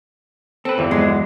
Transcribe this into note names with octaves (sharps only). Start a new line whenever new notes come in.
C4 A4 B4
G1 E2
F#3 G#3